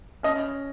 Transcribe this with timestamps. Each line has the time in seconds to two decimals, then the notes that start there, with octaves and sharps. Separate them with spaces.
0.23 C#4 D#5